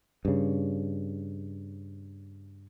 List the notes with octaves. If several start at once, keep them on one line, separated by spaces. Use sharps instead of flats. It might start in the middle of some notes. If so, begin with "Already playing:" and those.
G2 C#3